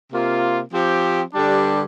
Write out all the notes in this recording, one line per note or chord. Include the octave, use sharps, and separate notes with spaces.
C3 A#3 F4
F3 C4 G4
G2 D3 G3 D4